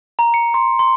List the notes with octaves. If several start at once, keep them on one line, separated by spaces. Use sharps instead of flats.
A#5
C#7
C6
C6